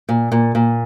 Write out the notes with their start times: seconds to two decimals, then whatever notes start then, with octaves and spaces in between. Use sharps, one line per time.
0.09 A#2
0.32 A#2
0.55 A#2